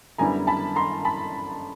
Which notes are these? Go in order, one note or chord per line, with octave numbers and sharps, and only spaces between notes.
F#2 D3 G3 B3 E4 G#5 A#5
A5 B5
A#5 C6
A5 B5